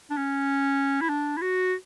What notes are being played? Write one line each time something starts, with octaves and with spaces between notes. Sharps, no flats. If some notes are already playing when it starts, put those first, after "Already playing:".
D4
C#4
E4
D4
E4
F#4